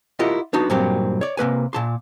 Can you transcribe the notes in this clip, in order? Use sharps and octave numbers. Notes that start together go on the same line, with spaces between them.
E4 F4 G4 A#4 D#5 F#5
B3 D4 D#4 F#4
G2 A#2 F#3 A#3 C4 G4
C#5 D5
C3 A#3 B4 G#5
A#2 A5 C6